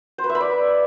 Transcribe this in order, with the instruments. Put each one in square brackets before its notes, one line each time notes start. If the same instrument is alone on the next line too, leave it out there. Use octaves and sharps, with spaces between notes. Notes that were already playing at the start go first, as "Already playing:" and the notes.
[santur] C5
B4
E5
B5
D5